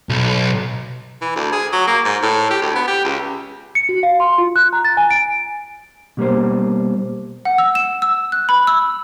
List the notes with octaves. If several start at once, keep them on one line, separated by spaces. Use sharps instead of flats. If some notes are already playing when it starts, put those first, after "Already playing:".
B1
E3
D2
G#4
F#3
A#3
G#2
A2
G4
D2
B3
G4
C#2
C#7
F#4
F5
C6
F4
F#6
A#5
A6
G#5
D7
B2 G3 A#3 C5
F#5
E6
E7
E6
F#6
B5
E6